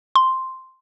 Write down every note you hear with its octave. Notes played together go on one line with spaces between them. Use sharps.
C6